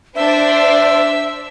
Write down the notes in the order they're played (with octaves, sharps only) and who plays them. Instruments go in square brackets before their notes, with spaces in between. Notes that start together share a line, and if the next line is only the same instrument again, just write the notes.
[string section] D4 C5 [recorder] E5